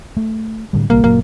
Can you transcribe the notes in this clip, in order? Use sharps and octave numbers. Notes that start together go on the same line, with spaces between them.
A3
A2 D3 G3
A#1 C3 G3 A#3
F#1 A#2 F#3 A#3